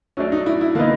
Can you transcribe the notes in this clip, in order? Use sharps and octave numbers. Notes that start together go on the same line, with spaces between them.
F#3 A3 C#4 D4
D#4
E4
E4
D3 F#3 A#3 B3 D#4